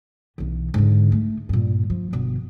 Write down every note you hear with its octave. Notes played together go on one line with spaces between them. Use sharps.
B1 E3
G#2 D3
A3
G2 A#2
F3
G1 B2